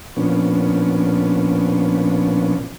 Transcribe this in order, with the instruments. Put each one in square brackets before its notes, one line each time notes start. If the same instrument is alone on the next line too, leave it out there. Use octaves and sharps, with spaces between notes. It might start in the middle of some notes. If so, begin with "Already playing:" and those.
[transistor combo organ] A#2 F3 B3 C#4 D4